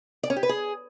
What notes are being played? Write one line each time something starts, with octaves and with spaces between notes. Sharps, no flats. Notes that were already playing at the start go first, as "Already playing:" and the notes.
D5
C#4
G4
B4
G#4